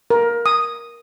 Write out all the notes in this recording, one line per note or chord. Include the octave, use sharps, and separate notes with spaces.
A#4
D#6